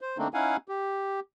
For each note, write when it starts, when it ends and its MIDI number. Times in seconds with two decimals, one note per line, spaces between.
0.01 0.18 72
0.18 0.28 50
0.18 0.28 57
0.18 0.28 58
0.18 0.28 60
0.18 0.28 62
0.18 0.28 63
0.34 0.57 61
0.34 0.57 63
0.34 0.57 64
0.34 0.57 77
0.34 0.57 78
0.34 0.57 80
0.68 1.20 67